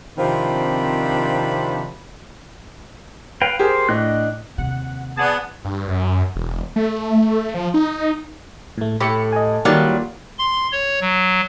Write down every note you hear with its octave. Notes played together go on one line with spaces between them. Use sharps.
C3 D#3 F3 C4 D4 B5
B4 F5 G5
G4 G#4 A#4 C5
A2 D4 D#5 F#6
D#2 C3 F#5
B3 G#4 D5 F#5 A5
G2
F#2
E1
A3
F3
D#4
A2 A3
A2 G4 B5 E6 C#7
D#5 G#5
D#3 F#3 G3 A#3 F4 D5
C6
C#5
F#3